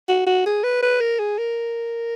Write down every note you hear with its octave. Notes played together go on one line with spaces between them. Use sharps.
F#4
F#4
G#4
B4
B4
A#4
G#4
A#4